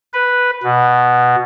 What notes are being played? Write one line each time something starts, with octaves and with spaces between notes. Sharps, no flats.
B4
B2